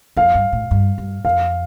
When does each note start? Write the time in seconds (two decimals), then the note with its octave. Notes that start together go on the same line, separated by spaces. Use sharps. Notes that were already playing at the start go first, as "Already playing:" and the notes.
0.16 F2 F5
0.35 G2
0.52 A2
0.71 G2
0.98 G2
1.25 F2 F5